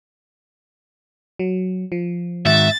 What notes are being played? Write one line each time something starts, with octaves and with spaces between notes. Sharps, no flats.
F#3
F3
G#2 D#3 F#4 E5 A6